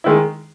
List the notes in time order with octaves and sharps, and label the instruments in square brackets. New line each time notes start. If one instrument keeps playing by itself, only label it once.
[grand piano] D#3 G#3 E4